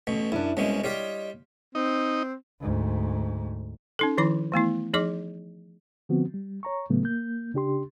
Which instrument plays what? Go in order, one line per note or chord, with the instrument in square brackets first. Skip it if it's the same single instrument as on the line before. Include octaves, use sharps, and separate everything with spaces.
[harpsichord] A1 B2
[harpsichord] F#2 [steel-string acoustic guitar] D4 E4
[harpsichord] C2 B2 G#3 [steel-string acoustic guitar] C#4
[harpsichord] G3 F4 G4 [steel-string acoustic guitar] C#5 D#5
[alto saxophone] C4 [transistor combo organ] D#4
[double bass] D2 G#2
[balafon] C#4 D#4 A4
D#3 F3 E4 B5 D6
E3 A3 B3 E4
F3 D#4 G#4 D#5 D6
[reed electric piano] D3 F3 B3 C4 F#4
G3
C#5 A#5 C#6
A2 C#3 F#3 A3 B3
A#3 G6
C#3 D4 G4 C6